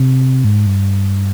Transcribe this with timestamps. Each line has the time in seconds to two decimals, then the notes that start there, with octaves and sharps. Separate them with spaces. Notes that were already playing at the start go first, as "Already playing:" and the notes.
Already playing: C3
0.45 G#2
0.67 G2